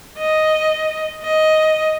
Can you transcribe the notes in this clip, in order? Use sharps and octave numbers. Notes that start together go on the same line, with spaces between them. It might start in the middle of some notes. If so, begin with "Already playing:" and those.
D#5
D#5